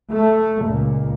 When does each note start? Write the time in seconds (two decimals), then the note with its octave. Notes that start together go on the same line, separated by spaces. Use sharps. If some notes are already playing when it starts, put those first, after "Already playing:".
0.11 A3
0.65 C#2 A#2